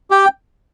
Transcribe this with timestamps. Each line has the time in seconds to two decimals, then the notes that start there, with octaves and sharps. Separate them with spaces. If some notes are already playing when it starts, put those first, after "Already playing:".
0.11 G4 G5